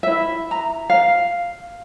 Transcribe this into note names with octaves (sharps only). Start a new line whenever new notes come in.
E4 E5
A#5
F5